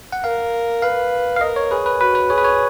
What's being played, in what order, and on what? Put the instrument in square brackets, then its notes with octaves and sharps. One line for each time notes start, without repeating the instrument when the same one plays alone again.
[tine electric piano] F#5
[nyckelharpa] A#4 [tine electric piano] F5
[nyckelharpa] B4 [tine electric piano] F5
[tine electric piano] F5
[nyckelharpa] A#4 [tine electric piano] D#5
[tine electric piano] C#5
[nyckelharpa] G#4 [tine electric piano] B4
[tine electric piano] B4
[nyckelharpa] F#4 [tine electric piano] B4
[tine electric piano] B4
[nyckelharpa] G#4 [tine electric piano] C#5
[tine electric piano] B4
C#5